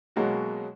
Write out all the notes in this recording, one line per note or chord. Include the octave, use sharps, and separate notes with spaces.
B2 F#3 G#3 A#3 C#4 F#4